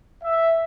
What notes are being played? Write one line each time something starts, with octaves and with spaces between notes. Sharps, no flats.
E5